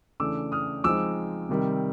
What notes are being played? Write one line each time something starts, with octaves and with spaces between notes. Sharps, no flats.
C#3 E3 A3 D4 D6 E6
D#6 F6
F3 G#3 C4 D#4 D6 E6
C3 D#3 G3